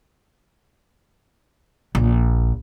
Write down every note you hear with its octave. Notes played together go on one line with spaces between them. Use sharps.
A#1